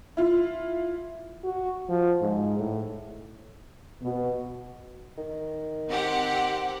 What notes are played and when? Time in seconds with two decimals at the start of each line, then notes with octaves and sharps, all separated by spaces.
0.17 E4 F4
1.44 F#4
1.89 F3
2.22 G#2
2.58 A2
4.02 B2
5.18 D#3
5.89 C4 G4 F#5